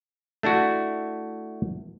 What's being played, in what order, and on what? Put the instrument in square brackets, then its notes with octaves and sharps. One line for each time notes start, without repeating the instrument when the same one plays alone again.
[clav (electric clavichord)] A3 D4 E4 F#4